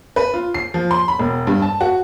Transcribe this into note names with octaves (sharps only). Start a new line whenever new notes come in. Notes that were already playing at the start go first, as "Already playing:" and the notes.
B4
F4
C7
F3
C6
B5
E1
G2
A5
F#4